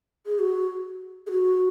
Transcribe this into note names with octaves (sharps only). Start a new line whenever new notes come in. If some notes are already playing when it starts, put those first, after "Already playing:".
G#4
F#4
G#4
F#4